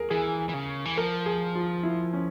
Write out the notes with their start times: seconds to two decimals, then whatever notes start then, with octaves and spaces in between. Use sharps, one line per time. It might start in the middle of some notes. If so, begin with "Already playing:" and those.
Already playing: G#4 A#4
0.10 E3 G#4
0.49 E3
0.54 C#3
0.85 E3
0.97 F3 A#4
1.26 G#4
1.55 F4
1.83 E4
2.13 C#4